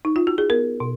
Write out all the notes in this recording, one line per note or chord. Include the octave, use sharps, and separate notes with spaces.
D#4
F4
F#4
G#4
B3 A#4
B2